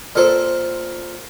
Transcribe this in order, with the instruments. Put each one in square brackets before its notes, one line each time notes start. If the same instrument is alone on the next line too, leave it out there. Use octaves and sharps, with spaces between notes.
[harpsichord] A#2 A4 C5